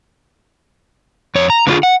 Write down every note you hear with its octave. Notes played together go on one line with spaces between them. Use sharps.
F2 C#5
A#5
D3 A#3 C4 F4 G#4
F#5